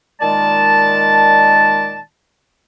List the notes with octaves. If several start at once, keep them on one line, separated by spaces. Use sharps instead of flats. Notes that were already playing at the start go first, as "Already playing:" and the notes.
A#2 D#3 G#3 D5 A5